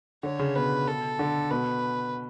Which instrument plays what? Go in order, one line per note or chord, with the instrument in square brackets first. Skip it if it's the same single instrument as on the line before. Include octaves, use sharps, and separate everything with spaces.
[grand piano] D3 [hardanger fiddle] C#5
[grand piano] C#3
[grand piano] B2 [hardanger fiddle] B4
[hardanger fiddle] A4
[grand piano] D3
[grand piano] B2 [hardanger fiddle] B4